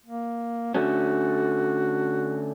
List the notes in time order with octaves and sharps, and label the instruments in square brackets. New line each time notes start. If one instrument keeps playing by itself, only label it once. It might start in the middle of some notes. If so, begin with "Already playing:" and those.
[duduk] A#3
[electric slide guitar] D3 A3 C#4 [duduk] F#4